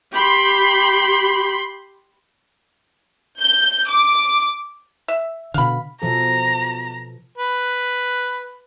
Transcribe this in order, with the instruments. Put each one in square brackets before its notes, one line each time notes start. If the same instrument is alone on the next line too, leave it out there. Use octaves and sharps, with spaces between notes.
[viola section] G4 B5 C6
[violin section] G6
D6
[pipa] E5
[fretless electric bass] B2 D3 [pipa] F5 B5
[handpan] B2 F3 A4 [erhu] A#5
[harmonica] B4